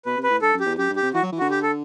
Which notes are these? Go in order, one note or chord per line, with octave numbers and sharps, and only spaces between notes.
B2 B4
C3
B4
A2
G2 A4
F#2
G4
E2
F#2 G4
G2
G4
C3
E3 F#4
F#3
E3
D3 F#4
G4
A4